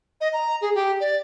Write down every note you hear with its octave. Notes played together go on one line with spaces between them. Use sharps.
D#5
A#5
G#4
G4
D5